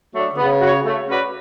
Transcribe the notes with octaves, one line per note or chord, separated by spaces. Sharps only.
F#3 A3 D4
D3
C#3 B3
F#4 C#5
A3
C#4 F#4 B4 D5